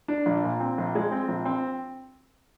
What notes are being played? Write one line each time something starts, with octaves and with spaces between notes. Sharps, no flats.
D4
A#1
A#2
C4
A#1
G#3
C4
A#1
C4